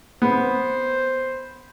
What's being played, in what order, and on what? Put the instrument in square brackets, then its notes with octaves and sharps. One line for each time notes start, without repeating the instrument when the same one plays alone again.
[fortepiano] B3 [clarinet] C5